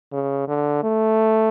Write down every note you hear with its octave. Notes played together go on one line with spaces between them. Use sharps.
C#3
D3
A3